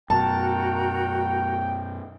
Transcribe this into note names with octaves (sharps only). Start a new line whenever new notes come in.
F#2 B2 F#4 A#4 G5 A5 A#5